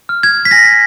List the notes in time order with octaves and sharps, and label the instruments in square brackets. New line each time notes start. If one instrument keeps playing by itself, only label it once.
[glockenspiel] F6
G#6
B6
G#5 A#6